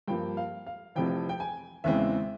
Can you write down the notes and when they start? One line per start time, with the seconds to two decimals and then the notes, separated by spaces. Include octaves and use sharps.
0.08 G2 F3 A#3 G5
0.37 F5
0.66 F5
0.95 F1 F2 C3 E3 G5
1.29 G5
1.40 G#5
1.84 E2 C#3 E3 G#3 C4 E5